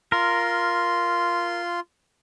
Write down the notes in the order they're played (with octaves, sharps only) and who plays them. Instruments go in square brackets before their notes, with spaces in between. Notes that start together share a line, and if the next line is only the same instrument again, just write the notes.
[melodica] F4 C6 [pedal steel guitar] A#4